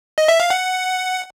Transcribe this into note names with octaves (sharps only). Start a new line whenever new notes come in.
D#5
E5
F5
F#5